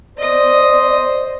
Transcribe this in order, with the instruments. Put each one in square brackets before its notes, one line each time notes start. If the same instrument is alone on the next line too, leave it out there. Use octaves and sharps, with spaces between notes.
[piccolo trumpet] C5 [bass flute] D5 [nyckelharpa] D#5 D#6